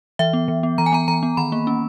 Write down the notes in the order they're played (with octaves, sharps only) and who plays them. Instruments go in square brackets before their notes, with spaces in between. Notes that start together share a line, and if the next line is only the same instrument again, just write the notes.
[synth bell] E3 E5
B3
E3
B3
E3 A#5
G#5
B3 A#5
E3 A#5
B3
D#3 B5
A#3
C#4